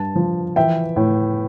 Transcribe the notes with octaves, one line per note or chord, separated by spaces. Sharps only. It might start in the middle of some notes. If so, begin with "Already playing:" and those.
Already playing: G2 A5
F3
E3 E5 G5
A2